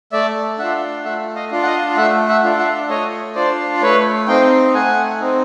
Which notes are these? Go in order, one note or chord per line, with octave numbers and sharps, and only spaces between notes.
A3 D5 E5
D4 F4 E5 F#5
A3 E5 F#5
D#5 F5
D4 F4
F#5
D#5 F5
A3 E5 F#5
E5 F#5
D4 F4
E5 F#5
A3 C#5 D#5
D4 F4 C5 D5
A3 B4 C#5
C4 D#4 F5 G5
A3 F#5 G#5
C4 D#4